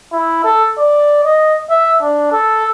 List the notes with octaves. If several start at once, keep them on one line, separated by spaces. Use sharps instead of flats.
E4
A4
D5
D#5
E5
D4
A4